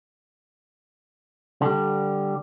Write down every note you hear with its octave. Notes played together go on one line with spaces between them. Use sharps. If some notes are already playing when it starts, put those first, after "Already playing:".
D3 G3